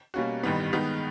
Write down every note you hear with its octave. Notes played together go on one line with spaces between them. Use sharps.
B2 G3 A#3 C#4 F#4
A1 G2 D#3 G3 B3
G2 D#3 G#3 B3 D#4